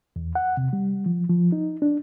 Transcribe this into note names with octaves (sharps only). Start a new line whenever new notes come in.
E2
F#5
C3
G3
F3
F3
D#4
D4